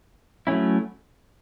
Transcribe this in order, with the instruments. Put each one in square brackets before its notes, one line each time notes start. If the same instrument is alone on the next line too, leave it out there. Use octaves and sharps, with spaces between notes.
[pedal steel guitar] F#3 A3 C#4 E4